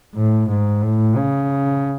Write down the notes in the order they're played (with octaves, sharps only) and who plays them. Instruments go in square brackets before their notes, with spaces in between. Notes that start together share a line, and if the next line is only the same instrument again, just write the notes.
[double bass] A2
G#2
A2
C#3